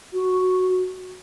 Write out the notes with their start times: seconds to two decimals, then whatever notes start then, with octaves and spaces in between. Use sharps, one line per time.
0.14 F#4